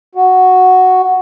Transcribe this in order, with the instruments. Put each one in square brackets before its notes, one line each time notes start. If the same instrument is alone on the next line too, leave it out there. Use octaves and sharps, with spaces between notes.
[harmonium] F#4